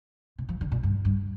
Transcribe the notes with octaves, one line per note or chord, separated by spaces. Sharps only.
C3
F3
D3
A#2
G2
G2